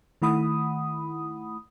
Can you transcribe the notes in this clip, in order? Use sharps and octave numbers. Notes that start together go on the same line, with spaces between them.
D#3 A3 E4 F#5 B5 D#6